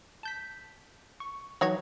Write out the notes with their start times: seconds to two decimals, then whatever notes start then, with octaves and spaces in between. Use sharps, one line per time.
0.23 A5 G6 B6
1.20 C#6
1.61 E3 F#3 D#4 F#4 C#5